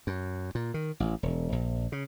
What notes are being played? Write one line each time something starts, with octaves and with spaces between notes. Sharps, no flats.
F#2
A#2
D#3
A1
E1
A#1
C#3